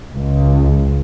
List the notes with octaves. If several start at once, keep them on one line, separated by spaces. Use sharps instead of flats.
C#2